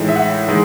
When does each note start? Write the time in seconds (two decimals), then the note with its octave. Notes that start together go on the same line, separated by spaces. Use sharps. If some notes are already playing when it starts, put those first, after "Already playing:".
Already playing: A2 E3 G#3 D#4
0.09 E5
0.15 F#5
0.48 E3 G#3 D#4